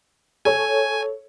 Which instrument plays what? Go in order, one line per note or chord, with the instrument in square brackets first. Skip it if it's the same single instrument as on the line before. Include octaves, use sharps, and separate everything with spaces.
[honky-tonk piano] A4 C#5 [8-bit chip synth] G#5